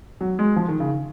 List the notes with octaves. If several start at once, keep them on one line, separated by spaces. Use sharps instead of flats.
F#3
G#3
F3
D#3
C#3